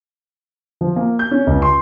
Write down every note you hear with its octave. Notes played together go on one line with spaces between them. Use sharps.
F3
A#3
G6
C#4
C#2
C6